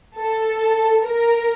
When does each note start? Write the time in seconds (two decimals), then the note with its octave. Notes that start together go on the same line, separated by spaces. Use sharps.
0.17 A4
1.04 A#4